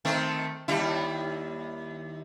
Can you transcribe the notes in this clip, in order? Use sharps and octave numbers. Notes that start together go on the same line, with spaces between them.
D#3 A3 C4
D#2 G3 E4